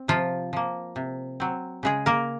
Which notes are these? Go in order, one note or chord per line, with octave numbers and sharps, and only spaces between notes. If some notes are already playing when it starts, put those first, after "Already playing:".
Already playing: C4
C3 F3 F4
F3 A#3
C3
F#3 C4
C#3 G#3 G#4
A#3 A#4